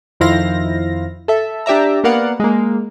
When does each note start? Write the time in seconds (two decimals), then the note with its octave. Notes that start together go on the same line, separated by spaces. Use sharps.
0.20 F2 D#3 E4 C5 F5 A#6
1.28 A4 E5
1.66 D4 G4 D5 E5 A#5
2.04 A#3 B3 A#4 D5 F5 F#5
2.40 G#3 A#3